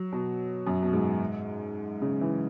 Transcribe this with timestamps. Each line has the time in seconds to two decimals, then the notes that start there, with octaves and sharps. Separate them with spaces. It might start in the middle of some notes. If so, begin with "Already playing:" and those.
Already playing: F#3
0.12 B2
0.67 F#2
0.83 B2
0.93 G#2
2.02 C#3
2.21 E3